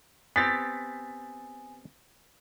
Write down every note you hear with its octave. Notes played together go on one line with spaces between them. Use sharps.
B3 C4 G4 G#5 A6 B6